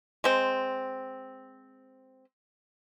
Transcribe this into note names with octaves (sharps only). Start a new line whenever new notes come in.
G#3 C4